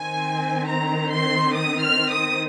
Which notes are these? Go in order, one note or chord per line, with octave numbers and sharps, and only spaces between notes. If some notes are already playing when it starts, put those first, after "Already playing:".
Already playing: D#3 C4 G#5
A#5
C6
D#6
F6
D#6